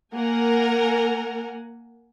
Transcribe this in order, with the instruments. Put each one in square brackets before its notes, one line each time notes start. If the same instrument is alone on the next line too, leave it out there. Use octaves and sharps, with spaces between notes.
[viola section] A#3 F#5 G#5 [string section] A#4